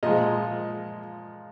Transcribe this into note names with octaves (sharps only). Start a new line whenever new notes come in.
A#2 F3 G#3 D#5